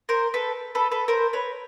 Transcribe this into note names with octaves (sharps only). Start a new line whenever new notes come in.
A#4 C5
A4 B4
A4 B4
A4 B4
A#4 C5
B4 C#5